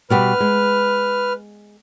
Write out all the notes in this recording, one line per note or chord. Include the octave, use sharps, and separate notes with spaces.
B2 G3 B3 B4 F6
G#3